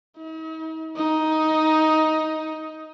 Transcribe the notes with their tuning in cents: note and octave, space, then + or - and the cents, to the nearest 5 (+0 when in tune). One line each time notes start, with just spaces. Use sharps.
D#4 +45
D#4 +10